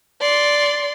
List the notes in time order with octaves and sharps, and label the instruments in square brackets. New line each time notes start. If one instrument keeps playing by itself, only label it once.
[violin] D5 C6